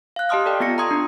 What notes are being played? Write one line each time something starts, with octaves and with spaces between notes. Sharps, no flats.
F5 F#6
G4 D#5 A5 C6 D#6 F6
A4 D5 D#5 G5
B3 F4 A#6 C#7
A#5 C6 C#6 D#6 G#6
D4